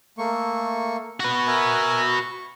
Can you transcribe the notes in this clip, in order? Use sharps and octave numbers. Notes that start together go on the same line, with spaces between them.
A3 A#3 C#6
F#4 B4
A#4 E5 G#5
C#6